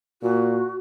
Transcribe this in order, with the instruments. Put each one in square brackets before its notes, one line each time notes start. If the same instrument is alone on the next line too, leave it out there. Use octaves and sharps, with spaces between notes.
[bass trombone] A#2 [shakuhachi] F#4